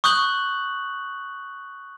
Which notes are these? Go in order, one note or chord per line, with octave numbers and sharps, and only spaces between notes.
C#6 D#6 F#6 G6 F#7